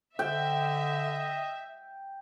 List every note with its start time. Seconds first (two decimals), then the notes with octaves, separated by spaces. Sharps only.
0.19 D3 D#5 E5 G5